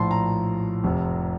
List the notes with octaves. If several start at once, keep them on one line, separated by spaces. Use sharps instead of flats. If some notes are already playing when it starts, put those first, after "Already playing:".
Already playing: A#1 A2 F3 A5 C6
A#5
F1 F2 C3